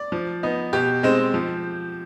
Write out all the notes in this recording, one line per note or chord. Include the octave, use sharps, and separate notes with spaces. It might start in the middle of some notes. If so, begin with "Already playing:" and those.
Already playing: D5
F3
B3 D#4
B2 G4
G#3 C4 D#4
F3